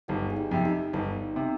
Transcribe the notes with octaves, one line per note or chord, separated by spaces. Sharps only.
G1 D#4 G4
G#4
D#4 G4
F2 C3
D#4 G4
G1 D#4
C3